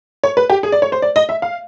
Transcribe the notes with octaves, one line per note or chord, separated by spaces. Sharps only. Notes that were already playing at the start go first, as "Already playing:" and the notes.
C#5
B4
G4
G#4
D5
C#5
C5
D5
D#5
E5
F5